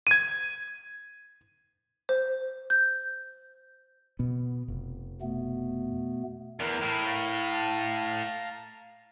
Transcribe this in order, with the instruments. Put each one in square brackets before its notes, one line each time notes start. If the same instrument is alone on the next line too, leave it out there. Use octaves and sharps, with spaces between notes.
[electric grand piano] G#6 D#7
[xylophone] C5
G6
[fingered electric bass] B2 B3
F1
[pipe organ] B2 A3 B3
[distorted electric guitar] E2 [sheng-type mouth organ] A#4
[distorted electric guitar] A2
[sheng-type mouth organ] F5 A5 A#5